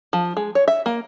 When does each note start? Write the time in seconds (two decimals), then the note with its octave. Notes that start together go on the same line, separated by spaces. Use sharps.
0.13 F3
0.37 G#3
0.55 C#5
0.68 E5
0.86 A#3